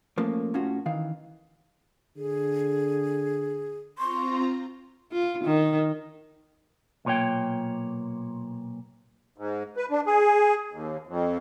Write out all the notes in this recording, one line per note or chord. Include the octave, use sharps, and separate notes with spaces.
F3 A3 A#3 C#4
A2 C#4 F4 F#4
D#3 E3 F5
D3 G#4
C4 F4 A#5 C6 C#6
F4
D#3
B1 A#2 C#5 G5
G#2
B4
D4
G#4
D#2
F2